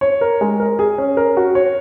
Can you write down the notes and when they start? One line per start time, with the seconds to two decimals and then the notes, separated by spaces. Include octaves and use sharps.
0.01 C#5
0.21 A#4
0.41 G#3
0.60 A#4
0.79 G#4
0.98 C#4
1.17 A#4
1.37 F#4
1.55 C#5